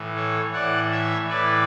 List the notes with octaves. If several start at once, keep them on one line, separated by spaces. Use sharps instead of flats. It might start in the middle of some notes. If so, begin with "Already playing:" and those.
Already playing: A2 E3
A4 C#5
A2 E3 D5 F#5
C#5 E5
A2 E3 B4 D5